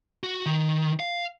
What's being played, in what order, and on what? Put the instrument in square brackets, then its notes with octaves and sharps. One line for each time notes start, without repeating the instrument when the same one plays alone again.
[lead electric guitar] F#4
D#3
F5